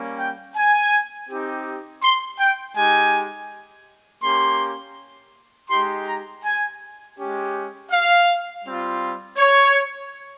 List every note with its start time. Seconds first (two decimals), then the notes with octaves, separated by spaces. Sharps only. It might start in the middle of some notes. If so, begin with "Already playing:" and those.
Already playing: G3 A#3 C#4
0.19 G5
0.56 G#5
1.29 C4 D#4 G4
2.03 C6
2.39 G5
2.77 G#3 D#4 G4 G#5
4.23 A#3 C#4 G4 C6
5.70 G#3 D#4 G4 C6
6.07 A#5
6.44 G#5
7.18 G#3 C#4 G4
7.91 F5
8.65 G3 C4 F4
9.38 C#5